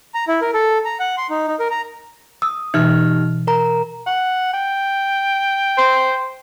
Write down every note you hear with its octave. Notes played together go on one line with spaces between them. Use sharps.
A#5
E4
A#4
A4
A#5
F#5
C6
D#4
D#4
A#4
A#5
D#6 E6
B2 E3 D#4 G4 F6
A#4 A#5
F#5
G5
C5